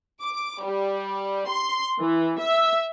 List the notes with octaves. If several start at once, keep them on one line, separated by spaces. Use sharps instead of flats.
D6
G3
C6
E3
E5